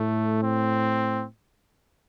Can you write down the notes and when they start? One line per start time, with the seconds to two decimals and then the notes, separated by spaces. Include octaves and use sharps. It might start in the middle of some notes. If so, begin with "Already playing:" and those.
Already playing: A2 A3
0.43 C4